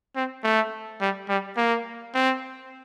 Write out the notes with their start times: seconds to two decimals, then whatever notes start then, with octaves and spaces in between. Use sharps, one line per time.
0.16 C4
0.44 A3
1.01 G3
1.29 G3
1.57 A#3
2.15 C4